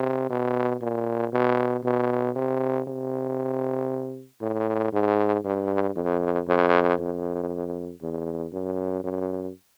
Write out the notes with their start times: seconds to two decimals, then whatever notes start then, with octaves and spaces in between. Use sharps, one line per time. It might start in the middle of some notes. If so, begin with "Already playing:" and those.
Already playing: C3
0.30 B2
0.82 A#2
1.33 B2
1.84 B2
2.36 C3
2.87 C3
4.41 A2
4.92 G#2
5.45 G2
5.96 F2
6.47 F2
6.99 F2
8.02 E2
8.53 F#2
9.04 F#2